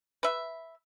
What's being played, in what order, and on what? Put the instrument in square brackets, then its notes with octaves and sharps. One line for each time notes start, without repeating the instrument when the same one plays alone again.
[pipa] B4 E5